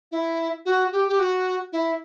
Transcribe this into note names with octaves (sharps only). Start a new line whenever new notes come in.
E4
F#4
G4
G4
F#4
E4